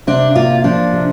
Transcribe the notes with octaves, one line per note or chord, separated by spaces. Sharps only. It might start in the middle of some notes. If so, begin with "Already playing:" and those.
C3 D4
A#3 F4
F3 D4
C3